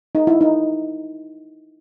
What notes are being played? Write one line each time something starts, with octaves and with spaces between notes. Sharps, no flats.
D#4
E4
D#4